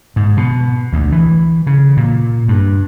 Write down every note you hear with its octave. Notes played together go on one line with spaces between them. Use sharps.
G#2
B2
D2
E3
C#3
A#2
G2